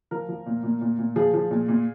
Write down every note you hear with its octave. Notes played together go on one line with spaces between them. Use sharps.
F3 A#4
F3
A#2
A#2
A#2
A#2
F3 G#4
F3
A#2
A#2